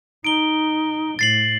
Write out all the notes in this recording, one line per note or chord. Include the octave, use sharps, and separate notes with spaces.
D#4 D7 G7
A2 A6 C7 F#7